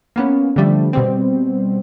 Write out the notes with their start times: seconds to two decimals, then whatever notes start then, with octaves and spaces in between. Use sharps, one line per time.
0.16 A#3 B3 C#4
0.56 D3 F3 G3 A3
0.93 B2 G3 C4